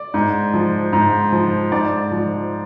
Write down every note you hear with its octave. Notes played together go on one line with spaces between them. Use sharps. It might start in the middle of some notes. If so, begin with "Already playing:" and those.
Already playing: D5
G#2
F3
G#2
F3
G#2 D5
F3